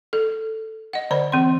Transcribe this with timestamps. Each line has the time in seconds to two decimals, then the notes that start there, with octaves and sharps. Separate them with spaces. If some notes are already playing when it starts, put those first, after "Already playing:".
0.13 A4
0.93 D#5 F#5
1.11 D3 C5 D5 B5
1.32 E3 C4 C6